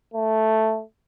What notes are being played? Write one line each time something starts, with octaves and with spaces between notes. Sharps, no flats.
A3